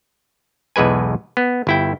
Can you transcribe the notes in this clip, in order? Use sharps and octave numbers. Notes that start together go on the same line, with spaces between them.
B1 E2 G#3 B4 G#5
B3
G1 E4 G5